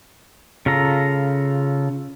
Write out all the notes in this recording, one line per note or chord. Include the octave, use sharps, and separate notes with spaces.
C#3 F4 A4 A#5